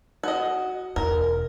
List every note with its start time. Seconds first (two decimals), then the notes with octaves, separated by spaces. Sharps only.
0.23 F#4 D#5
0.96 E1 E2 A#4